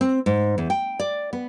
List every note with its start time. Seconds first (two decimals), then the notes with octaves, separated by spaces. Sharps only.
0.01 C4
0.26 G#2
0.58 E2
0.70 G5
1.00 D5
1.33 B3